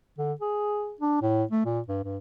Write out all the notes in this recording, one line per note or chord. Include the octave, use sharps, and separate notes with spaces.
D3
G#4
D4
A2
A3
A#2
G2
G2